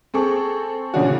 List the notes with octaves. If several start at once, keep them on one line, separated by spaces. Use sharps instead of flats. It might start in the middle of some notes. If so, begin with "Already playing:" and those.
C4 G#4 A4 C#6
A#2 C#3 E3 C#4 D4 F#4